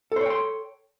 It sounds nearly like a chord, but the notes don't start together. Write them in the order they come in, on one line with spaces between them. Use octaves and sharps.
A4 C5 C#5 G5 C6